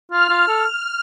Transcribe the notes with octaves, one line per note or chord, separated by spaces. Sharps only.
F4 F6
F4
A4